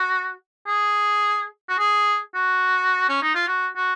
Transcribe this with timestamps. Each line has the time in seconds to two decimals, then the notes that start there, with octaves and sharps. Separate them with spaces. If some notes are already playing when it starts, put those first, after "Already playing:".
Already playing: F#4
0.67 G#4
1.69 F#4
1.79 G#4
2.34 F#4
3.09 C#4
3.22 D#4
3.35 F4
3.47 F#4
3.76 F#4